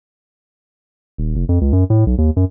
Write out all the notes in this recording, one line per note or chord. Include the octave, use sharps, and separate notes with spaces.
D#1
F1
F2
C#2
F#2
A2
B1
D#2
F#2